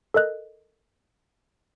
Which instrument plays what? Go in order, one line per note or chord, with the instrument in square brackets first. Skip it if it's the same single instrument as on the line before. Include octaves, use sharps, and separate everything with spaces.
[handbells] A4 A#4 D#5 F#6